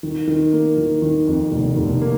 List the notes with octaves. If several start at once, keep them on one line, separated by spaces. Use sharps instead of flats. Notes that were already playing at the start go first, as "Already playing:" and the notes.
D#3
D#3
A#3
D#3
D#3
F2
F1
F1
A#3